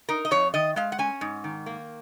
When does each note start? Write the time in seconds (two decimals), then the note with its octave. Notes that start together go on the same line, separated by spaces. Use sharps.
0.09 D#4 A#4
0.25 D#5
0.31 F2 C#5
0.54 D#3 D#5
0.76 G#3 F5
0.92 F#5
0.99 C#4 G#5
1.21 G#2
1.44 D#3
1.66 A#3